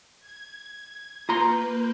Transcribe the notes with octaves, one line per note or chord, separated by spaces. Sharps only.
G#6
A#3 F4 B4 A#5 C6 G6